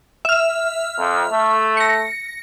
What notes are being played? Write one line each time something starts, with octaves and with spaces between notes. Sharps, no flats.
E5 F6
F2
A3
A#6 C#7